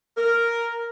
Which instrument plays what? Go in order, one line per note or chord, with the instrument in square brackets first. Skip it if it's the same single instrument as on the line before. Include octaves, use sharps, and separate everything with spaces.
[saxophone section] A#4